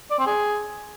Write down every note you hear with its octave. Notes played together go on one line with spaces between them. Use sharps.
D5
C4
G#4